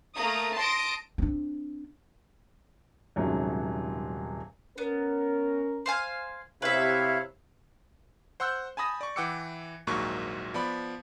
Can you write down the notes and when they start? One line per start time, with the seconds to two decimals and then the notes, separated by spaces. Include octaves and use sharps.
0.16 A3 A#3 A#5 D#6
0.56 A5 C6 D#6 A#6 D7
1.18 C4 D4
3.16 D#1 G#2 C3 F#3 C#4
4.78 B3 C#4 A#4
5.86 C5 F5 G#5
6.62 C3 E4 B4 C#5 E5 F5
8.40 C5 F#5 C6 E6 F#6 G6
8.77 G#5 A5 B5 D#6 A#6
9.01 D5 C#6
9.16 E3 F#5 G5 D6 E6 C#7
9.87 A#1 D#2 G#2 F#3 A#3 C#6
10.54 F3 B3 D5 B5